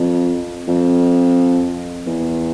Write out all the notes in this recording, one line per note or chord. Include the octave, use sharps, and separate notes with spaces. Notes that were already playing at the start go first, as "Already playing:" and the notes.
Already playing: F2
F2
E2